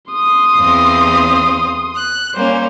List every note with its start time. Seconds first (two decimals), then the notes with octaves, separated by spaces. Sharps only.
0.12 C6 D#6
0.58 E2 C4 F5
1.94 F#6
2.35 G3 A#3 C#4 C5